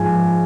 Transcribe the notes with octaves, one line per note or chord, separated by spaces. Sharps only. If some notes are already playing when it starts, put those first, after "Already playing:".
Already playing: G#2 F3 G#5